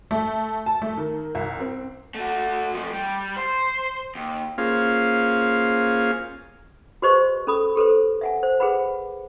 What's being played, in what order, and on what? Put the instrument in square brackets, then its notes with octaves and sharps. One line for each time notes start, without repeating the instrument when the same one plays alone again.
[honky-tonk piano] A3
A5
A3
D#3
C2
C4
[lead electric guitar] A3 F#4
F3 A3
G3
C5
D#2
[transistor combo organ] A#3 C#4 F4 G#4 C5 F5
[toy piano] F#4 G#4 B4 C5 D#5 C#6
C#4 A4 B5 D#6
G4 A4 B4 C5
E5 F#5 G#5
C5
G#4 B4 C5 F#5 B5